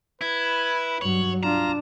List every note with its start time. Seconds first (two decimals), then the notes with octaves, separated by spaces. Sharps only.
0.21 E4 B4 G#6
1.01 G2 F#3 C#5 F#7
1.43 D4 F4 A#5 E7